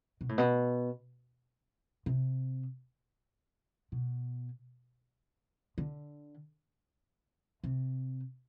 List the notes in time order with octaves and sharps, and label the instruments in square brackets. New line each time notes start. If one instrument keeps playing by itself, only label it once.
[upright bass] B2
A2
B2
C3
B2
D3
C3